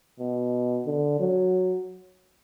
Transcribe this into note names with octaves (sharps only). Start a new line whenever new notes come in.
B2
D3
F#3